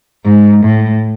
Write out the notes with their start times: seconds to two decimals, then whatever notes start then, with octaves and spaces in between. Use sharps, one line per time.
0.25 G#2
0.64 A2